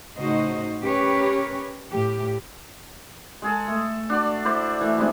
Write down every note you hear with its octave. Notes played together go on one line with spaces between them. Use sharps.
A2 C#3 D#4 F#4 C5 D#5
C#4 G4 A#4 B4 C#5
A2 G4
G#3 G#4 A4
A3
D4 F#4 D5
E4 C5 D5
E3 A3
G3 G#3 C4 D4